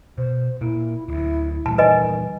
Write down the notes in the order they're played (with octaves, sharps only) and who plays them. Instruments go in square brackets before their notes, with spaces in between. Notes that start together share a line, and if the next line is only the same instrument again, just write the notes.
[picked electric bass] B2 [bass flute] C5
[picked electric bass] A#2 A#3 [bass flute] E4
[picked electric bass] D1 D2 [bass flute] E4
[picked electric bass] A#2 E3 G3 [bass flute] A3 [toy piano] A5
[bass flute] D#3 [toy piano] B4 D#5 G#5